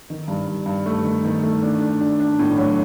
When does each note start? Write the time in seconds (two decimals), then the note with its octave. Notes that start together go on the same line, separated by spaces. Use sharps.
0.10 D#3
0.28 G2
0.48 G2
0.66 G2
0.86 A3
1.05 D#3
1.25 D#3
1.43 A3
1.63 D4
1.81 D4
2.01 D4
2.20 D4
2.39 A2
2.58 F#3